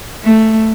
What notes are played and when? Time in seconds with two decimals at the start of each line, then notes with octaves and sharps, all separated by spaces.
0.24 A3